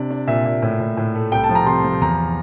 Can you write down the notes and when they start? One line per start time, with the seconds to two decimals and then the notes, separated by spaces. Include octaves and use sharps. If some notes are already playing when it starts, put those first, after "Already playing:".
Already playing: C3 D4 D5
0.10 D4
0.27 A#2 E5
0.45 A#2
0.62 A2
0.80 A2
0.97 A2
1.15 A3
1.32 C2 G5
1.44 A5
1.49 F3
1.55 A#5
1.66 C3 C6
1.84 F3
2.01 E2 A#5